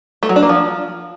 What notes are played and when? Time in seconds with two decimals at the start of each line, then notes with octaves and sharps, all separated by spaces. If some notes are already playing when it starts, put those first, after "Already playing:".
0.23 A3
0.29 F#3
0.36 D4
0.43 A#3
0.49 F3